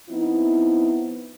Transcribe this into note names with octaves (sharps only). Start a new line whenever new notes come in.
F3 B3 C4 D#4 E4